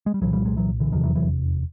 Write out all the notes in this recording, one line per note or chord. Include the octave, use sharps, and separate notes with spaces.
G#3
G3
C2 A#2 E3 F#3
F3 G3
F#3 G#3
E3 F#3
D3 E3
F1 E2 C3 D#3 F3
E3 F#3
E3 F#3